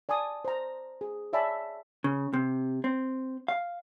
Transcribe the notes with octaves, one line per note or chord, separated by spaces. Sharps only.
D5 G#5 A5 D#6
C5 A#5
G#4
C#5 D5 E5 G#5 A5 B5
C#3
C3
C4
F5